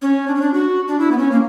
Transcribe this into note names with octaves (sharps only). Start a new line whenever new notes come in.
C#4
D4
C#4
D4
F#4
D4
E4
B3
C#4
A#3